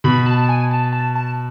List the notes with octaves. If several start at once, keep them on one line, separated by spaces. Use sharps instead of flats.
B2 B5
A5
A5
G#5
A5
A5
A5